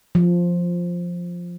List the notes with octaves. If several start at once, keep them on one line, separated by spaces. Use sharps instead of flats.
F3